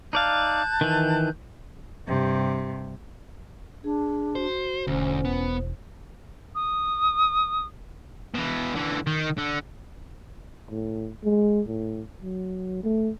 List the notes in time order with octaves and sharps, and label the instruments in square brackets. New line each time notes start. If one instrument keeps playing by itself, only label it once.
[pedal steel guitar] D#4 D5 F5 [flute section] A5 F#6 G6
[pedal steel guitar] D#3 E3
[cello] G2 C3
[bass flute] D4 [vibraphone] G#4
[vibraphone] F#4 [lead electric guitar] C5
[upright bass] E1 [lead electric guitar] D2 [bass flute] C#4 [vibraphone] C5
[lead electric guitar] B3
[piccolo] D#6
[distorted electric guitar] B2 E3
D3 E3
D#3
D3
[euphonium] A2
G#3
A2
F#3
A3